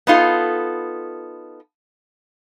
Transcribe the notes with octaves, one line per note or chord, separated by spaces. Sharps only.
B3 D#4 F4 A4